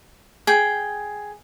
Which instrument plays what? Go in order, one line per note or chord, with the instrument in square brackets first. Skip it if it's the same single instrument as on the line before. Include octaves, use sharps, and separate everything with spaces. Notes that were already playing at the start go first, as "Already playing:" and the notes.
[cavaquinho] G#4 G5